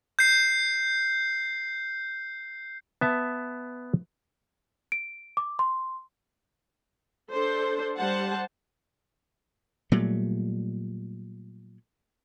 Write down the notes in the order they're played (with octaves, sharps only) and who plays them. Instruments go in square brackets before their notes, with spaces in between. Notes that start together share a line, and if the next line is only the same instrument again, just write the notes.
[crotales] G6 C7
[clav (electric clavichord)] B3 E5 A5
[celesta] D7
D6
C6
[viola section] D4 A4 C5
G3 C5 F#5 A5
[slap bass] A#2 F#3 G3 A3